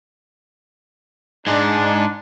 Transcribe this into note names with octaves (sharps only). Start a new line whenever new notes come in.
G#2 G#3 D4